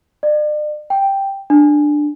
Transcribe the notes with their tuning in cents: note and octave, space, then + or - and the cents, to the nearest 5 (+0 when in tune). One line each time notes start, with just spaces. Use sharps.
D5 +40
G5 +0
D4 +10